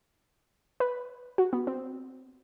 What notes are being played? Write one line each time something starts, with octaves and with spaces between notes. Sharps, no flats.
B4
F#4
B3
C4